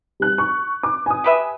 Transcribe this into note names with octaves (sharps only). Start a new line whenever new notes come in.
G3 F#6
C#6
D6
G#5 D#6
G4 B4 E5